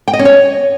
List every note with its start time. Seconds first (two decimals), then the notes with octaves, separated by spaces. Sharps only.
0.08 G5
0.13 D#5
0.19 C#4
0.25 C#5